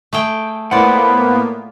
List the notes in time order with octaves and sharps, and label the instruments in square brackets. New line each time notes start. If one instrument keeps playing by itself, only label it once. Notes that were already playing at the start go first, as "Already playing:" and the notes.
[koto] A3 G#4 G5
[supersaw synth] A2 A#3 B3 [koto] F4 D5 [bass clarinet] B4 [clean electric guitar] C5 F#5